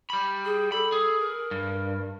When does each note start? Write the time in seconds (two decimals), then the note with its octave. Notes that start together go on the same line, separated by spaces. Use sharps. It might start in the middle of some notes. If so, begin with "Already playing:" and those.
0.10 G3 B5
0.45 G#4
0.72 A4 B5
0.92 G#4
1.19 A#4
1.51 G2